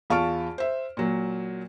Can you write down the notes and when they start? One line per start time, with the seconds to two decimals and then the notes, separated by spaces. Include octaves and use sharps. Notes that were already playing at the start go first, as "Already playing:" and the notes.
0.10 E2 F4 A5 C#6 F6 D7
0.58 C5 E5
0.97 A#2 F#3